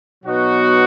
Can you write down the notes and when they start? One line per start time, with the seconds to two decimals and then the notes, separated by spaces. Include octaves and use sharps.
0.24 B2 F#3 B3 D#4 F#4